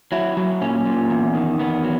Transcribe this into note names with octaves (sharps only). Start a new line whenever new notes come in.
F#3 E4
F#3
A#2 C#4
A#2
E2
D#3
E2 B3
F#3